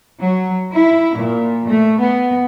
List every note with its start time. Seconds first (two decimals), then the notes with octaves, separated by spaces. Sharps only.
0.20 F#3
0.72 E4
1.16 A#2
1.67 A3
1.99 B3